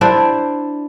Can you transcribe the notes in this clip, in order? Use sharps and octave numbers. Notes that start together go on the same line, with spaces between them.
D4 E4 C5 D5